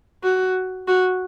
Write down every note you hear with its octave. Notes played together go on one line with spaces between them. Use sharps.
F#4
F#4